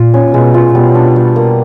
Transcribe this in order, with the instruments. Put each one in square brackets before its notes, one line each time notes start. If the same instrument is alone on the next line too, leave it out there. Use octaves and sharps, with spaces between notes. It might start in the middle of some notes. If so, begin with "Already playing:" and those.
Already playing: [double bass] A#2 [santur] F4
[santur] C#4
[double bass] B2 [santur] G#3
[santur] F4
[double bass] B2 [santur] G3
[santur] D4
G3
A#3